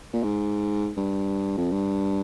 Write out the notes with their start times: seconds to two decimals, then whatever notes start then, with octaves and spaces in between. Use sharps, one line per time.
0.13 A#2
0.23 G#2
0.97 G2
1.57 F2
1.72 G2